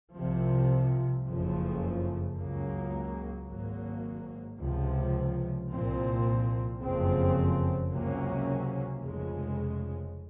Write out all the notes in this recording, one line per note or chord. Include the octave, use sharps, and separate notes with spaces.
C2 C3 F3
F#1 F2 C#3 F3
C#2 C#3 F#3 A#3
G#1 G#2 F#3 A#3
C#2 C3 F3
C2 A#2 F3 C4
F#1 F2 C#3 F3 C4
C#2 C3 F#3 A#3 C#4
F1 F2 C#3 G#3